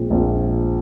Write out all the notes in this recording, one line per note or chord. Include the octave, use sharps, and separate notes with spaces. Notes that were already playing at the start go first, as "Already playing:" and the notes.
Already playing: A#1 A#2 G#3 C4 F4
A#1 A#2 G#3 C4 F4